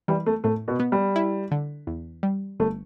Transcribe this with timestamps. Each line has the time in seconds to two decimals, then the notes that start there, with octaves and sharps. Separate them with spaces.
0.08 E3 G3
0.26 A3
0.44 A2 A3
0.68 B2 B3
0.80 B3
0.92 G3
1.16 E4
1.51 D3
1.87 E2
2.23 G3
2.60 G1 A3